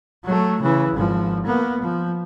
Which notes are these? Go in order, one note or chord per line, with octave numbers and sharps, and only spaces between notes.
F#3 A3
C#3 E3
G#1 F3
A#3 B3
F3